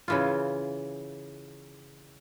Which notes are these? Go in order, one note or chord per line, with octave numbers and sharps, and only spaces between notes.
C#3 E3 F4